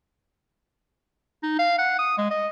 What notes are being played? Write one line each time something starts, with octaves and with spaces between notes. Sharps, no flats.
D#4
F5
F#5
D#6
G#3
D#5